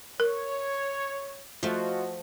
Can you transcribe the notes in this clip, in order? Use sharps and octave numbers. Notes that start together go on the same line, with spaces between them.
A#4 C#5
F3 A3 F4 F#4 D#5